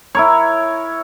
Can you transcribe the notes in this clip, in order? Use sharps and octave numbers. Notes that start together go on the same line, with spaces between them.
E4 A#4 C#5